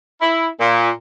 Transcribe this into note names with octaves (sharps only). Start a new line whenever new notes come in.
E4
A#2